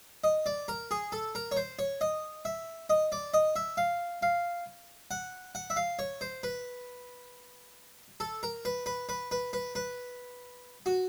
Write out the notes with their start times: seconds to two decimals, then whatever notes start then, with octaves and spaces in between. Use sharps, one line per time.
0.24 D#5
0.46 D5
0.68 A#4
0.91 G#4
1.12 A4
1.35 A#4
1.52 C#5
1.57 C5
1.79 C#5
2.01 D#5
2.45 E5
2.90 D#5
3.12 D5
3.34 D#5
3.56 E5
3.77 F5
4.22 F5
5.11 F#5
5.55 F#5
5.70 E5
5.76 F5
5.99 C#5
6.21 C5
6.43 B4
8.20 A4
8.43 A#4
8.65 B4
8.86 B4
9.09 B4
9.31 B4
9.53 B4
9.75 B4
10.86 F#4